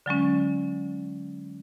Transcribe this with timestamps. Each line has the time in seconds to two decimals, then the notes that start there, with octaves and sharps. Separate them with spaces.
0.06 D3 F#3 G#3 C#4